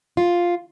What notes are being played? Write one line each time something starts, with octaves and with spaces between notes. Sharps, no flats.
F4